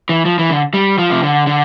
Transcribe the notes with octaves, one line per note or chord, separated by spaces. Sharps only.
E3
F3
E3
D3
G3
F3
C3
D3
D3